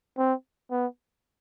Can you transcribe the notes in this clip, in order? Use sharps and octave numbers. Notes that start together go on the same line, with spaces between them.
C4
B3